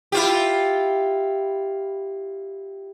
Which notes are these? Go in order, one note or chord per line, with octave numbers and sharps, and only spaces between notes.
E4 F4 G4